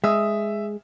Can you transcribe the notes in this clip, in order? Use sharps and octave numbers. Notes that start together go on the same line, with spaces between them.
G#3 E5 D#6 E6